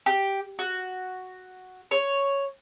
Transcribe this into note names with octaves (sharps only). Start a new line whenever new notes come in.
G4
F#4
C#5